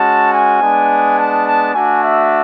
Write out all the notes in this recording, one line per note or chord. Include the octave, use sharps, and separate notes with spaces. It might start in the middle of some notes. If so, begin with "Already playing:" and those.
Already playing: G#3 C#4 F#4 A5
G#5
G#3 B3 D4
A5
A5
A3 D4 F#4 G#5
E5